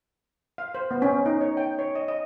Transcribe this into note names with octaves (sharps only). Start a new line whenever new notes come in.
F5
C5
B3
C#4
D#4
C#5
G5
C#5
D#5
D#5